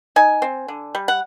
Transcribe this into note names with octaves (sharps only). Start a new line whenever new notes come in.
D#4 G#5
C4
D3
G3
F#5